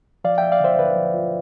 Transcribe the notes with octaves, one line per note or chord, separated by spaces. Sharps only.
F3 D5 F5
F3 E5 G5
D5 F5
D3 C5 E5
D3 B4 D5
F3
F4